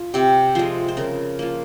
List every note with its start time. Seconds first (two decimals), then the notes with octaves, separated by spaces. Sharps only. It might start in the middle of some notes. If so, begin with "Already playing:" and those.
Already playing: F4
0.14 C3 G4
0.55 F3 G#3 C5
0.88 C5
0.97 C#3 A#4
1.39 F3 A#3